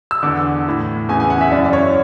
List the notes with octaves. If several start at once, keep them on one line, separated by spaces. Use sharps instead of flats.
E6
E2 D3 D6
A2 E3
E2 C#3 E3 G#5
G#5
F#5
E5
F#2 E3 D5
D5
C#5